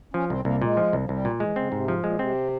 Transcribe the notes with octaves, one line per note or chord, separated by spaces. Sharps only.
F3 C#4
C2 C4
C2 A#3
A#2 G#3
F3
C2
F3
C2 G3
A#2
E3 G#3
C#3 C4
G#2 C3
F3
A#2 G#3
C3 C4